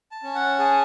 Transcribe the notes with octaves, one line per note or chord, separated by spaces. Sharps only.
A5
C#4
F#5
G#4 A5